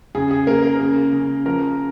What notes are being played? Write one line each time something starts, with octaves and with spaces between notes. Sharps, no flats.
C#3 G#4
G#4
A#3 A#4
A#4
C#3
C#3
F3 A#4 A#5